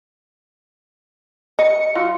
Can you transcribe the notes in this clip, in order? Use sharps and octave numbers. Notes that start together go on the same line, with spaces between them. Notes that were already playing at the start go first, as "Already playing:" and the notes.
D#5 C#7
F#3 F4